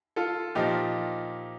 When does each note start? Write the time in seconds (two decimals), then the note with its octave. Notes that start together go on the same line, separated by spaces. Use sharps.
0.16 F4 A4
0.55 A#2 F3 D#4 G4